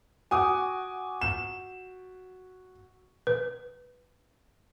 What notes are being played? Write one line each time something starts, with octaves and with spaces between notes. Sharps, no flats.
F#4 G#5 D6 D#6
E7
B4